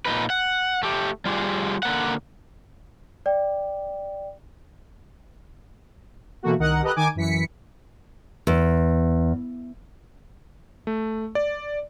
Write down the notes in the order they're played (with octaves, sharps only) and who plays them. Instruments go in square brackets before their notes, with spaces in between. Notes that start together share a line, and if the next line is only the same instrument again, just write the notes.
[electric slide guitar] A#2 D#4 B4
F#5
A3 G4
G3 F4 G4 G#4
D3 A#3 F#5
[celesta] D5 G5
[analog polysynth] B2 E3 A3 A#3 F#4
C2 D#3 A#4 D#5 F#5
G4 A4 B4 D#5 A#5 F#6
D#3 D#4 G#5 D6
F#2 E3 B6 C#7
[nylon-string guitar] E2
[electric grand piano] A3
D5